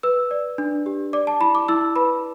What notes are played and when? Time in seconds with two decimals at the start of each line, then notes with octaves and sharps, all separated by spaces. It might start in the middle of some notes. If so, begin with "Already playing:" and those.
0.03 B4 E6
0.31 D5
0.58 D4
0.86 G4
1.13 D5 D6
1.27 A5
1.41 E4 B5
1.55 D6
1.68 E4 E6
1.96 B4 B5